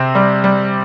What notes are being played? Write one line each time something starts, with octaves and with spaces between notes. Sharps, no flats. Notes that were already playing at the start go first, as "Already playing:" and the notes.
Already playing: C3 C4
G3
G3